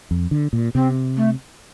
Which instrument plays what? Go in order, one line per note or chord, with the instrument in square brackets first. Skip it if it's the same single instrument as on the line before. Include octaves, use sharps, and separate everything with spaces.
[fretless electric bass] F2
D3
A#2
[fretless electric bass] C3 [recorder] C4
[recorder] A3